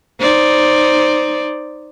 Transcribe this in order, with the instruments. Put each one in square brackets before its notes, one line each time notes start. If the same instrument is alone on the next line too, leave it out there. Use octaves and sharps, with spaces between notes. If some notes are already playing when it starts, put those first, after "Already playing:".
[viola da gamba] D#4 C5 D5